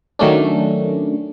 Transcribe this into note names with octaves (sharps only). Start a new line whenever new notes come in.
D#3 F#3 A3 C#4 D4